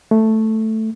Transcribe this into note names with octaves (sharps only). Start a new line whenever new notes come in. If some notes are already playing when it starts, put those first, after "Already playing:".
A3